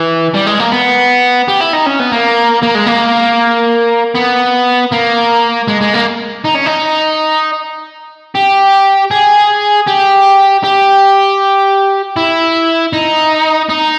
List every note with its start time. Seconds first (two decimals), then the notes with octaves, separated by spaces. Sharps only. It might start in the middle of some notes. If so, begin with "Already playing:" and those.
Already playing: E3
0.34 G3
0.46 G#3
0.60 A#3
0.72 B3
1.48 G4
1.61 E4
1.74 D#4
1.86 C#4
2.00 B3
2.12 A#3
2.63 A#3
2.75 G#3
2.87 A#3
4.15 B3
4.92 A#3
5.68 G#3
5.81 G#3
5.93 A#3
6.44 D#4
6.55 C#4
6.66 D#4
8.35 G4
9.11 G#4
9.87 G4
10.64 G4
12.17 E4
12.93 D#4
13.69 D#4